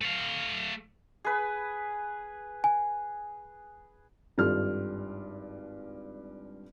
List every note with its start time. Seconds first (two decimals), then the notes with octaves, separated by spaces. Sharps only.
0.01 A3 F5
1.25 G#4 B4
2.64 G#5
4.38 G#1 G2 F4 G4 A4 F6